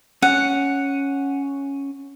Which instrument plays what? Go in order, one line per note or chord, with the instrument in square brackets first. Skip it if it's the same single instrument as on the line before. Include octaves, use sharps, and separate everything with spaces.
[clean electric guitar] C#4 [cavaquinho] F#5